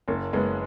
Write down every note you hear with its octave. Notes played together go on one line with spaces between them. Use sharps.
F#1 A#3 C#4
F#1 G#3 B3